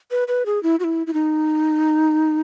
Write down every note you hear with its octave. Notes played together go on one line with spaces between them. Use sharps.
B4
B4
G#4
E4
F#4
E4
E4
D#4